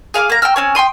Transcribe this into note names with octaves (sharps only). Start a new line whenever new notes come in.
G#4 F5 A5 D6
A#3 A#5
G5 A#5 E6 F6
C4 C#4 G#5
G5 G#5 C6 D#6